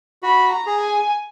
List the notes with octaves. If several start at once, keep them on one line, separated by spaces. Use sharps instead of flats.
F#4 B5
A#5
G#4
G#5